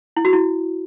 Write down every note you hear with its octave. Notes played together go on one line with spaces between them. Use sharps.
E4
F#4
E4